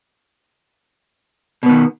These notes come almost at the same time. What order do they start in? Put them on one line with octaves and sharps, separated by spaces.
B2 B3 D#3